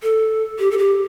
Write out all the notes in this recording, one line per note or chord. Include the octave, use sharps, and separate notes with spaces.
A4
G4
A4
G4